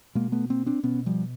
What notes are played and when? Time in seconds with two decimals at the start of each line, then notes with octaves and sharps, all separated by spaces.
0.15 B2 G#3 A#3
0.32 A3 B3
0.50 A#3 C4
0.66 C4 D4
0.83 B2 B3 C#4
1.06 F3 G3